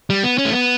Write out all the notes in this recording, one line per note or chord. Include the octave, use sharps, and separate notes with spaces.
G3
B3
C#4
A3
B3